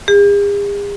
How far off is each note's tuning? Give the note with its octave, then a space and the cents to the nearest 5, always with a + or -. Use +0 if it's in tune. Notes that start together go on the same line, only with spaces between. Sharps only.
G#4 -45